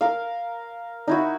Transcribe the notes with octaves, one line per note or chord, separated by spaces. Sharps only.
A#4 F5
D#4 E4 F#4